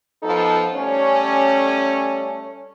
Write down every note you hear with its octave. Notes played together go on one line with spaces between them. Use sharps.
F3 B3 D#4 A4
G3 A3 C#4